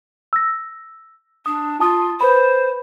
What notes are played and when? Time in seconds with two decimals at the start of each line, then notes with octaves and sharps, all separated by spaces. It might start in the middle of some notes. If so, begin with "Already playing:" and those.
0.33 E6 A#6
1.46 D4 D#6
1.80 F4 A5 D#6
2.21 B4 C5 B5